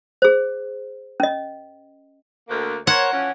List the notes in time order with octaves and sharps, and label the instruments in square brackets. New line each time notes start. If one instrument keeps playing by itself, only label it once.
[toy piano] G#4 C5
C#4 D#5
[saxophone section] D2 A#3
[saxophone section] A#4 C5 C#5 [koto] F#5
[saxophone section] E3 F3 C#4